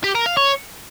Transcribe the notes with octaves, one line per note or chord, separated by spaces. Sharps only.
G4
A#4
F5
C#5